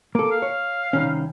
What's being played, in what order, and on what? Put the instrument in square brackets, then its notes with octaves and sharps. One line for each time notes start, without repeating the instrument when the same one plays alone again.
[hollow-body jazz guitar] A#3 A4 [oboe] D6
[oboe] F5
[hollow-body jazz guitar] C#5
C2 D#3 C#4